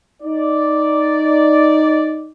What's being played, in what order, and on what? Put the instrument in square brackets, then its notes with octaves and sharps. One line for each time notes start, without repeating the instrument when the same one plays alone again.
[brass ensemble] D#4 D5